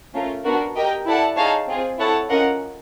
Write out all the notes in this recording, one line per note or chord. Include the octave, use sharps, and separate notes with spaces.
A3 C#4 F4 A#4
B3 D4 F#4 A#4
G4 A#4 D#5 G5
E4 A4 D5 F#5 A5
D#4 G#4 C#5 F5 A5
C4 F4 G#4
E4 A4 C#5 F#5 A5
C#4 F4 A#4 D#5 F#5